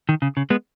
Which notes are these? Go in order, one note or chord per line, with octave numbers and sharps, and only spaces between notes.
D#3
C#3
C#3
G#3 B3